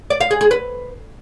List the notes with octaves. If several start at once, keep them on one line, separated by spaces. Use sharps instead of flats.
D5
F5
G#4
G#4
B4